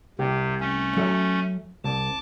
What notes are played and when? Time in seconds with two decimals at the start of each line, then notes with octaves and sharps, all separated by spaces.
0.19 C2 C3 G4 G5
0.60 A3 C#4
0.97 F#3 A4 E5
1.84 C2 A5 D6